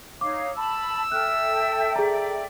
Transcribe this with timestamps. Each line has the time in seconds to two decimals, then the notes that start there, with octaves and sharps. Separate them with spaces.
0.21 D#4 C#5 F5 D6
0.56 A5 B5 E6
1.12 A4 E5 G5 F6 F#6
1.96 G#4 D5 A#5